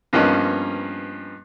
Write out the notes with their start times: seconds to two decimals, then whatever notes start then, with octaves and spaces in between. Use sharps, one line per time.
0.13 G2 F3 A#3 B3 C#4 D#4